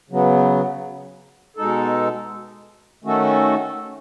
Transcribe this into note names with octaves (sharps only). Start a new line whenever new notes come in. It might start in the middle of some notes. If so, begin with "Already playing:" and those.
C#3 F#3 B3
B2 G#3 D#4 A4
D#3 A3 C#4 F#4 A4